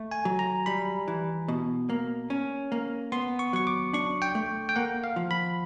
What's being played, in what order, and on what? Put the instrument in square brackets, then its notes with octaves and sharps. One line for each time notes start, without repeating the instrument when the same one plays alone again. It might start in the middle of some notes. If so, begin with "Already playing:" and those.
Already playing: [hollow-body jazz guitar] A3
[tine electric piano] G#5
[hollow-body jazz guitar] F#3
[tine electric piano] A#5
[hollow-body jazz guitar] G3 [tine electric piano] B5
[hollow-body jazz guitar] E3
B2
A#3
C#4
A#3
[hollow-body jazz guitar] B3 [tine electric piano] C6
[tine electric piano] C#6
[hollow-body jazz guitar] F#3 [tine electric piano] C#6
[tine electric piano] D6
[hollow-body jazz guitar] D4 [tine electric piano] C#6
[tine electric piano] G5
[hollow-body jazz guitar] A3
[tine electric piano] G5
[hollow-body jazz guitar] A#3 [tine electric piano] F#5
[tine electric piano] F5
[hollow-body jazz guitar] F3
[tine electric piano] B5